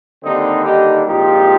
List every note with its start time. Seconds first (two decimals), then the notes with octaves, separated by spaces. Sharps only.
0.22 D#2 D3 G3 A#3 C4 D#4
0.64 D#4 G4
1.05 C2 A#2 F3 G#3 D#4 G4